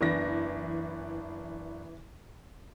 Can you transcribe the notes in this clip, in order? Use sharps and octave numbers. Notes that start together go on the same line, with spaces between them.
F#1 E3 B3 D4 A#6